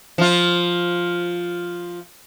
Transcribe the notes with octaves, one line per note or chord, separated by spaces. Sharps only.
F3 F4